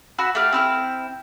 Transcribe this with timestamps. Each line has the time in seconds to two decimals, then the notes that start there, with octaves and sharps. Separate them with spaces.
0.18 F#4 B5 E6
0.35 A3 G4 F5
0.52 C4 E4 F6